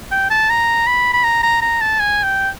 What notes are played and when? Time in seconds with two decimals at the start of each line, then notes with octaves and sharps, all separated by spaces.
0.12 G5
0.31 A5
0.50 A#5
0.87 B5
1.13 B5
1.24 A#5
1.43 A#5
1.62 A#5
1.81 A5
2.00 G#5
2.24 G5